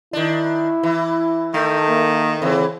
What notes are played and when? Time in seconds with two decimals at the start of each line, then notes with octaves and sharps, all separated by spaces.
0.13 D#3 D4 E4
0.83 E3
1.54 D#3 A3
1.89 A#3
2.42 C#3 E3 C4